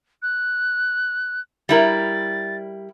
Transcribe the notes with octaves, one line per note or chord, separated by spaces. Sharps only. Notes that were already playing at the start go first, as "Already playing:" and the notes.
F#6
G3 E4 A#4 A6